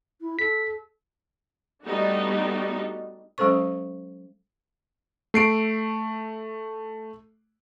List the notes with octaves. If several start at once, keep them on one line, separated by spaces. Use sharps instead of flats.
E4
A4 B6
G3 A3 B3 D4 D#4 F#4
F#3 G#3 C#4 A4 C5 C#6
A3 C7 D7